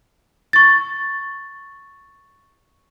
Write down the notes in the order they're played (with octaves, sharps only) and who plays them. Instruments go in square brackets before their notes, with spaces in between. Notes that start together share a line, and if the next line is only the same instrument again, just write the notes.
[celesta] C#6 A6